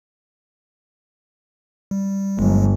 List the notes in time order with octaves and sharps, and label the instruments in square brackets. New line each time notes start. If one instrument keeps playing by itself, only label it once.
[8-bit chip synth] G3
[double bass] G1 [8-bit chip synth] F#3 G#3